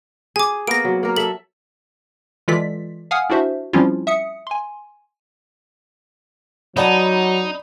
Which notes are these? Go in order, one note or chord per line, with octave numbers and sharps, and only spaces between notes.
G#4 G#5 D6
A#3 B3 F5 A#6 D7
F#3
A#3 A#4
A4 E5 F#7
E3 G#3 F4 A4 D5 B6
F5 F#5 G#5 D#6 F6
D4 E4 F#4 C5 E5
F3 G3 C4 C#4 E4 F4
E5 D#6 C#7
G#5 C6
F#3 D#4 C#5 D5 F#5 A5 B5